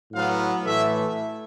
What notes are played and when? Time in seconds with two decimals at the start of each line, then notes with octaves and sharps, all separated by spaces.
0.12 A2 F#3 B3 F5
0.65 A2 E3 A3 E5